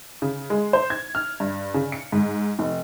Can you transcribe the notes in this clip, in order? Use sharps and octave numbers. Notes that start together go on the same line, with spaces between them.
C#3
G#3
C5
G#6
F6
G2
C#3
C#7
G#2
F1